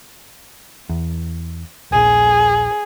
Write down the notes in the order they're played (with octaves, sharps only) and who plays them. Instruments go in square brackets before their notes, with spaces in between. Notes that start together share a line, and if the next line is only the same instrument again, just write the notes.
[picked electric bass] E2
[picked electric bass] D#1 A#1 [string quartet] G#4